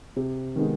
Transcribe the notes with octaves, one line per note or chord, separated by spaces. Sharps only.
C3
D#3 G#3 B3 D#4